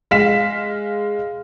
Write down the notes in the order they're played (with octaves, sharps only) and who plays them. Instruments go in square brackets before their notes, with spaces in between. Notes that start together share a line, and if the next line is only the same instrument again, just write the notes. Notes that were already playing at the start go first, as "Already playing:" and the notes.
[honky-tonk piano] G#3 F5 B6 E7